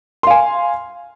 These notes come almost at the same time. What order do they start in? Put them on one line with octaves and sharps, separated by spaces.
C6 F5 G#5